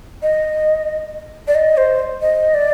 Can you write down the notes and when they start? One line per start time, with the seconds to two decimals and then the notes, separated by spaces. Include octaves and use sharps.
0.22 D#5
1.48 D5
1.55 D#5
1.77 C5
2.22 D#5
2.54 D5